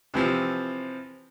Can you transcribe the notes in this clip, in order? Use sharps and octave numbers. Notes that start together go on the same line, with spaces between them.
C3 E3 F3